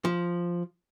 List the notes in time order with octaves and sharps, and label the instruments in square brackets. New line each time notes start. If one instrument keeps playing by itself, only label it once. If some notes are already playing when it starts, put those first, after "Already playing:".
[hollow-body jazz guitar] F3